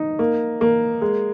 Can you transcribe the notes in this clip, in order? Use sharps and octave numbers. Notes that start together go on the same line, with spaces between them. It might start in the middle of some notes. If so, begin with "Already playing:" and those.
Already playing: D#4
A#3
A#3
G#3